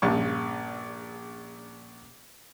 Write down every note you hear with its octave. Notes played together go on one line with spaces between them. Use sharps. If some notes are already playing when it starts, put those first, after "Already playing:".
A#1 G2 C#3 A5 C#6 D6